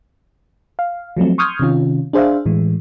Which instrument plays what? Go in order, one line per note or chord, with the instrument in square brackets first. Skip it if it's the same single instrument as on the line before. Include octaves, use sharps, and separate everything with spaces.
[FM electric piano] F5
F3 F#3 A3 C4
C6 C#6 D#6 F6 G6 G#6
C3 D#3 C#4 F4
D4 G#4 C5 E5 F5
A2 E3 G#3